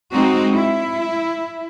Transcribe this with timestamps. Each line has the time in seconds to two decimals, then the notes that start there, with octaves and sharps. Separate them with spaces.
0.13 G#3 C4 D#4 F#4
0.54 E4